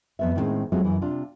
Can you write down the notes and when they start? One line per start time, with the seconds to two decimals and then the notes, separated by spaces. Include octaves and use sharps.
0.19 F2 B3 E5
0.36 A2 D#3 G3 G#3 C4 C#4
0.72 F#3 G#3 A3 C4 F4 F#4
0.84 F#2 E3
1.02 C3 D4 F4